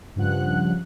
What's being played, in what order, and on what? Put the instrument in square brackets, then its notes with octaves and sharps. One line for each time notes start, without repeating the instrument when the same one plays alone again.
[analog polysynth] G2 C#3 F3 F#5 F#6